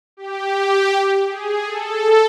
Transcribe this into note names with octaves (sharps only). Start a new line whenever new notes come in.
G4
G#4
A4